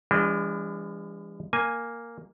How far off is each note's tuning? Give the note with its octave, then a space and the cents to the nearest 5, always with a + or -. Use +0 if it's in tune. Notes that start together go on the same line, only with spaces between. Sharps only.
E3 +30 G#3 -45 D4 -25
A#3 +0 G#5 +0